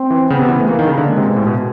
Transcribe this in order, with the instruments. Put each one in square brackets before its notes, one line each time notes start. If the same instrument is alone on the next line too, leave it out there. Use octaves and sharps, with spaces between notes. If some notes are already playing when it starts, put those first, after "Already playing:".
Already playing: [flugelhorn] C4
[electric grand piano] E3
[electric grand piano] C#3 [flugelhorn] B3
[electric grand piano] C3
E3
A3
[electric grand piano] E3 [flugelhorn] A#3
[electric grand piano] D#3
C#3
D3
[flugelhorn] G#3
[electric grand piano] C3
B2
A2
B2